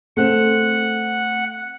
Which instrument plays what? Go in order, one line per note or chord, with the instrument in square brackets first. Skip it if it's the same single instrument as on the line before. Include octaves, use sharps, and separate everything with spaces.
[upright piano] A3 C4 [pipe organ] F#5